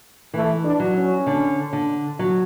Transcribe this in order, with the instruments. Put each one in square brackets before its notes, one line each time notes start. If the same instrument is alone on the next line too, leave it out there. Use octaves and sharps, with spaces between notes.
[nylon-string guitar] E3 [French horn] A3
[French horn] D4
[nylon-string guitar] F#3
[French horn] C#4
[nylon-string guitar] D3
D3
F#3